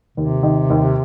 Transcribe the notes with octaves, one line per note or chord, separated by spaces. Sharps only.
D#2 C3
D#3
D#2